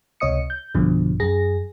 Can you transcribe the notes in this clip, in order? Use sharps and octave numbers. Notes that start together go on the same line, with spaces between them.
C#2 C3 C#5 D#5 D#6 C#7
G6
B1 G2 B2 D3 F3
F#2 G#4 A#6